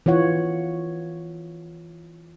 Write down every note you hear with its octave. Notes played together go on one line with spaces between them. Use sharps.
E3 F4 C#5 F#5